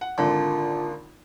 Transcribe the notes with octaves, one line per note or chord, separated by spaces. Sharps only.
F#5
G#1 A#2 D3 F4 A5